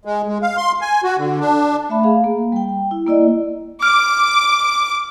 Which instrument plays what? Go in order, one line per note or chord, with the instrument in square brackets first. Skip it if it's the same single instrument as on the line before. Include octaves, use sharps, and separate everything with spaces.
[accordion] G#3
G#3
F5
C6
G#5
F#4
D3
D4
[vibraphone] A3 E5 B5
G#4 F5
A#3
G3 G5
E4
A#3 E4 D5 D#5
[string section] D6 [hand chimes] F6